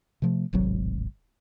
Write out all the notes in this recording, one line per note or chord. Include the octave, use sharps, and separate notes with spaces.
C3 F3 A3
D1 G#1 C3 F#3